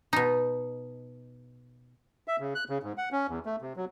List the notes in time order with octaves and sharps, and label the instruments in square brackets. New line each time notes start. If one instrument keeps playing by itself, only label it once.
[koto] B2 D#4
[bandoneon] E5
C#3
F#6
C#3
G#2
F#5
C#4
E2
A3
C3
F#3